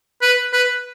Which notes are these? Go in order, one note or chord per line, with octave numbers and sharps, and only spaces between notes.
B4
B4